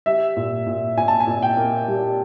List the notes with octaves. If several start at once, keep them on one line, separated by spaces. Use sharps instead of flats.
G3 E5
A#2
A#2
A#2 G#5
A5
G#5
A#2
G5
A#3
G3